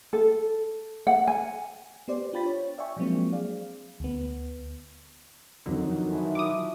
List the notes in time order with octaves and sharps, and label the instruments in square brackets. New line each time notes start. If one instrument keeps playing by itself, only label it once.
[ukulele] A4
F#5
G#5
[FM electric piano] B3 G4 C5 D5
D4 F4 G5 B5 A6 B6
C#5
D5 E5 F5 G5 G#5 C#6
F3 F#3 G#3 A#3 C4 D4
G#4 D5 F5
D2 B3
[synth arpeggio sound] F2 D3 [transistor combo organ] D#3 F#3
[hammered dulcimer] E3 F3 C#6
[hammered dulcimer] F3 E4 [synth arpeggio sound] D6 D#6